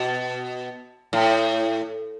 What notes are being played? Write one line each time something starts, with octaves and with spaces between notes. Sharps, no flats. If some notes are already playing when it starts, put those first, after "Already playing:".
Already playing: B2
A2